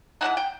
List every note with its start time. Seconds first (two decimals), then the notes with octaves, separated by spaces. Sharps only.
0.21 E3 G#3 C4 D#4 F#5
0.37 G5